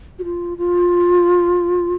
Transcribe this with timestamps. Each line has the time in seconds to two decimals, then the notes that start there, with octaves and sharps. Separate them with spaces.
0.19 F#4
0.24 F4
0.58 F4